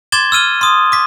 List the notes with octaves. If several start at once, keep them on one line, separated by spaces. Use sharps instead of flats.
C6 D6 G#6 A6 E7 G7
E6 F6 D#7 G7
C6 D#6
D6 B6